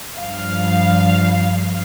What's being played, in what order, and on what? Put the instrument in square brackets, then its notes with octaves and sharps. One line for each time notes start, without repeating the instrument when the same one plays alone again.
[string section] G2 F3 F5